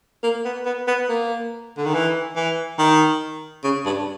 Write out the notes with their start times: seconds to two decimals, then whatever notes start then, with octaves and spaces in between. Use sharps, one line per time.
0.23 A#3
0.45 B3
0.66 B3
0.87 B3
1.09 A#3
1.77 D3
1.86 D#3
1.94 E3
2.36 E3
2.79 D#3
3.64 C#3
3.86 G2